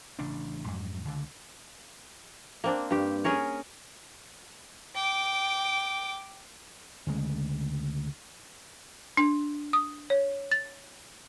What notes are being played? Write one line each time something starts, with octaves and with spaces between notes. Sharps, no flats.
A1 C#3 D4
F2 G#2 F#3
C#2 D3
A#3 C4 D4
G2 G4
C#4 G#4 A#4 C#5
G5 D6
D2 C#3 G#3
D4
D#6
C#5
A6